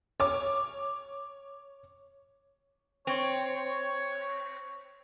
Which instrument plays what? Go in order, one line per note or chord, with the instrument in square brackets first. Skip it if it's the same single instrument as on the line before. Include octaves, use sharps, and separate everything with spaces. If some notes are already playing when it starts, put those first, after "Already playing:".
[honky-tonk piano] C#5 D6
[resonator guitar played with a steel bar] C4 [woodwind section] C#5